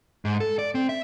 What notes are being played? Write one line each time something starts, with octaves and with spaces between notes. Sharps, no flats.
G#2
A4
D5
C4
E5